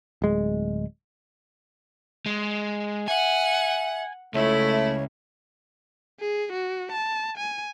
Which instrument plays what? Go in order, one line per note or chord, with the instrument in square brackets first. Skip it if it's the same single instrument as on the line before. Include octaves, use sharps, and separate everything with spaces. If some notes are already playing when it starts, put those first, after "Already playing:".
[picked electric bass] D1 G#3
[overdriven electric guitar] G#3
[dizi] E5 [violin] F#5 [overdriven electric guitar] G#5
[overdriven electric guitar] C#2 [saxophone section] A3 [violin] E4 [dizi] C#5
[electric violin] G#4
F#4
A5
G#5